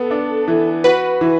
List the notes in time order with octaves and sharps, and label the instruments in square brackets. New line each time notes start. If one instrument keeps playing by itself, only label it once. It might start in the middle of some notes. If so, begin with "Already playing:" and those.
Already playing: [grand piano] B3 [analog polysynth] A4
[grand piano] D4
E3
[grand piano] F#4 [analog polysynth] B4
[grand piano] E3